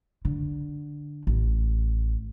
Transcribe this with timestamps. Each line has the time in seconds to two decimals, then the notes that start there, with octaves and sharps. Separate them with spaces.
0.25 D3
1.27 A1